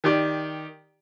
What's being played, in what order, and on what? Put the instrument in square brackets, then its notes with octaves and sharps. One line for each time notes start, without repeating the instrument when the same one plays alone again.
[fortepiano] D#3 G4 D5